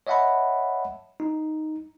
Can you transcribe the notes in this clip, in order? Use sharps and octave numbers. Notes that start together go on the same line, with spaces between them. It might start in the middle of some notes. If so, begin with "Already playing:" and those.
C#5 D#5 E5 F#5 A5 B5
D#4